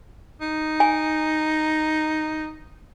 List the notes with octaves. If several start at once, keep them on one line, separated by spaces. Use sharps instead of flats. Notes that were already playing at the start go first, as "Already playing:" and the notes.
D#4
G#5